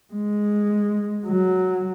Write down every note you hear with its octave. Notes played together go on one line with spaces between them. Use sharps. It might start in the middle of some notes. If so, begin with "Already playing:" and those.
G#3
F#3